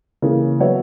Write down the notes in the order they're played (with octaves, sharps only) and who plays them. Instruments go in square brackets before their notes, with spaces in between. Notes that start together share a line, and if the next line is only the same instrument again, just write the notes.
[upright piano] C#3 E3 A#3
F#3 B3 F#4 C#5 E5